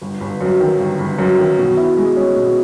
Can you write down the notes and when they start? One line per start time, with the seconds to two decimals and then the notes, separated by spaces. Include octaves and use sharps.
0.02 G1
0.21 G1
0.41 F#2
0.60 D#3
0.79 G1
0.99 G1
1.19 F#2
1.39 D#3
1.58 B2
1.77 E4
1.97 G#3
2.16 C#4
2.36 B2